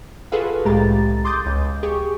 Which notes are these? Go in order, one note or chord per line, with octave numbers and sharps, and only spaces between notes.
F4 F#4 G#4 A4 B4 F5
C2 A2 G#3 G4 A#5 A6
C6 D6 D#6 G6 A6
C#2
G4 G#4 C#6